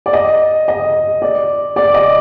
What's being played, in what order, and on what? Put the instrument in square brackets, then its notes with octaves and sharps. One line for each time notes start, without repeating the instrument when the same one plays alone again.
[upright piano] D5
D#5
D#5
D5
D5
D#5